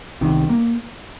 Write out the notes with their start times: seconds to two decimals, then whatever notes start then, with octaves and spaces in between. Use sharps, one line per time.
0.21 C2 C3 D#3
0.50 A#3